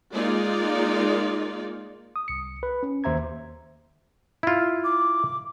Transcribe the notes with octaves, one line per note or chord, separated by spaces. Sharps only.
G#3 A#3 D#4 F4 D5
D#6
C2 C#7
B4
C#4
D#2 C5 E5 A#5 G#6
E4 F4
D6